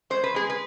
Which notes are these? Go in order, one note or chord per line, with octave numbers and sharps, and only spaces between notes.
G#3 C5
B4
G#3 G#4
B4